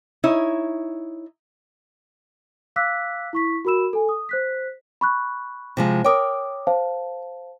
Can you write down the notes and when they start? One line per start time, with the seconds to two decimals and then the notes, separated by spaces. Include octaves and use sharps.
0.24 D#4 E4 C#5
2.76 F5 D6 E6 F#6 B6
3.33 E4 C#6 B6
3.65 F#4 A#4 B5 E6 E7
3.93 A4 G#5
4.09 D#6
4.29 C5 F#6 B6
5.01 B5 C#6 F#6
5.77 C3 F3 G#3
6.04 A#4 C#5 G5 D6 D#6
6.67 C5 F5 A5